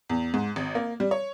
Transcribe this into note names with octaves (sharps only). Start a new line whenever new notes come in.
E2
G#2
G#1
A#3
G3
C#5